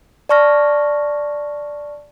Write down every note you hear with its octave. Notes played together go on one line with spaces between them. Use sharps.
D5 A5 C#6 F6 A#6